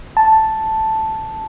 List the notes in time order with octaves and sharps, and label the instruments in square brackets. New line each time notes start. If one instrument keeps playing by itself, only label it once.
[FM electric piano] A5